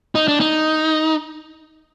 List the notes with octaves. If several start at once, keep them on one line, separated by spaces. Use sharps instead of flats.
D#4
D4
D#4